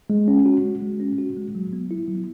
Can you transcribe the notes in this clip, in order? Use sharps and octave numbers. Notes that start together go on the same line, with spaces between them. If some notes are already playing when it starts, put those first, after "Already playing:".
G#3
C#4
F#4
G#3
G#3
C#4
F#4
G#3
F#3
B3
E4
F#3